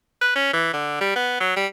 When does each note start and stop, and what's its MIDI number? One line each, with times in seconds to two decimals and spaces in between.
0.21 0.31 71
0.35 0.51 61
0.53 0.73 52
0.73 0.99 50
1.01 1.14 55
1.16 1.36 59
1.41 1.55 54
1.56 1.67 55